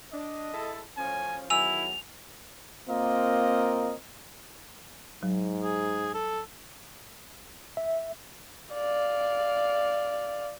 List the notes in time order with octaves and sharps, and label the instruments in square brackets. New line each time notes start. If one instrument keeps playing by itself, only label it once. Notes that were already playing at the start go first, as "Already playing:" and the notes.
[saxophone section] D4 [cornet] D#5
[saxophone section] G#3 E4 A4
[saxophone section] A2 F3 C#4 [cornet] G#5
[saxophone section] E2 D#3 F#3 [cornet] E4 [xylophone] G#5 E6 [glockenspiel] F7
[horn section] A#3 C4 F4 A#4 D#5
[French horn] G#2 [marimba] F#3
[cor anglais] G#4
A4
[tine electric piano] E5
[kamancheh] D5 F5